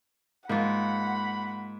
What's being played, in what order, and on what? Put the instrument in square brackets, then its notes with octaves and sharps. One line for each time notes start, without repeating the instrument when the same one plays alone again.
[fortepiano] G#2 [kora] A#3 F4 [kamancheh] F#5 [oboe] B5